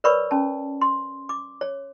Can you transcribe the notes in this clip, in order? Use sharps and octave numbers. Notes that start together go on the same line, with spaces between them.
A#4 B4 C#5 D5 B5 C#6
C#4 A5
C6
D6
C#5